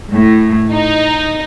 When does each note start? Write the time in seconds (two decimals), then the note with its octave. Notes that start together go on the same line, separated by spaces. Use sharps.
0.14 A2
0.72 D#4